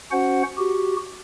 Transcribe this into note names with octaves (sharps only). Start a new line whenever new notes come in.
C#4 F#4 C5 F#5
F#4 G4